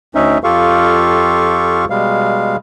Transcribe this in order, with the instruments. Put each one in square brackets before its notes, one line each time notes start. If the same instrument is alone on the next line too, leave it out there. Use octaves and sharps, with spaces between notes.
[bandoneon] D2 C#4 D#4 E5
F2 F4 G4 A4 F5 C#6
B2 G3 G#3 F5